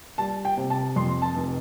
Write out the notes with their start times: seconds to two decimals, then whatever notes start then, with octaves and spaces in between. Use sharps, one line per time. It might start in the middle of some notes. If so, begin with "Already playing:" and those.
0.18 G3 A5
0.45 G5
0.57 C3
0.70 A5
0.96 F2 C6
1.22 A5
1.35 F1